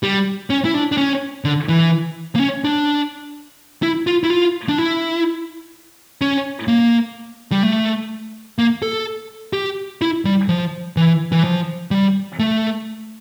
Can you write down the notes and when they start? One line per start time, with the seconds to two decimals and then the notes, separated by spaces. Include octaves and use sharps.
0.03 G3
0.50 C#4
0.65 E4
0.74 D4
0.92 D4
0.98 C#4
1.45 D3
1.69 E3
2.36 A#3
2.40 C#4
2.65 D4
3.82 E4
4.07 F4
4.24 E4
4.30 F4
4.69 D4
4.78 E4
6.21 C#4
6.68 A#3
7.52 G3
7.63 A3
8.59 A#3
8.82 A4
9.53 G4
10.02 E4
10.25 G3
10.49 F3
10.97 E3
11.32 E3
11.44 F3
11.91 G3
12.39 A3